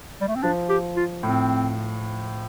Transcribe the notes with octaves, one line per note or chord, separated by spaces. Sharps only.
G3
A3
C4
F3 D4
G4
F4
A2 C4